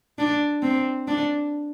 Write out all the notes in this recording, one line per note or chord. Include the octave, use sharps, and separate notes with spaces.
D4
C4
D4